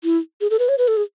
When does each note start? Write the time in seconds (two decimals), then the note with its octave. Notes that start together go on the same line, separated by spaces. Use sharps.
0.04 E4
0.41 G#4
0.50 A4
0.59 B4
0.69 C#5
0.78 B4
0.88 A4
0.97 G#4